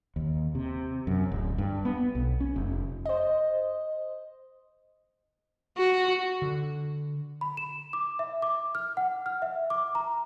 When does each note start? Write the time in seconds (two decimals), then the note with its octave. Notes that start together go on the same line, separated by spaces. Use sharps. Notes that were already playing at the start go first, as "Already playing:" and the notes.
0.16 D#2
0.55 C3
1.07 F#2
1.32 D1
1.58 G2
1.85 B3
2.15 B1
2.40 C#4
2.56 F1
3.06 C5 D#5
5.78 F#4
6.42 D3
7.41 B5
7.57 E7
7.93 D6
8.19 E5
8.42 D6
8.75 F6
8.97 F#5
9.26 F6
9.42 E5
9.70 D6
9.95 A#5